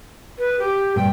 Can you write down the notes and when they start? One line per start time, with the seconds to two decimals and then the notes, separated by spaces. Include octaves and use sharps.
0.38 B4
0.59 G4
0.96 G2 A#2 G5